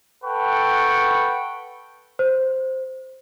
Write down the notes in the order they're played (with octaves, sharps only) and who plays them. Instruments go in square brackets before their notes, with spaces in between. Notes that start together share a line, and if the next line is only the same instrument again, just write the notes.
[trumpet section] A4 B4 F#5 G5 C#6
[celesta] C5